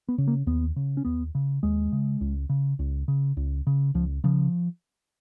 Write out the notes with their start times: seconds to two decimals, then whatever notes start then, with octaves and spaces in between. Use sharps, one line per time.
0.09 B3
0.18 C#3
0.28 A#3
0.47 D#2 B3
0.76 C#3
0.97 C#4
1.05 D#2 B3
1.35 C#3
1.63 D#2 G#3
1.92 C#3
2.21 C#2
2.50 C#3
2.79 C#2
3.08 C#3
3.37 C#2
3.67 C#3
3.95 C#2 F3
4.24 C#3 F3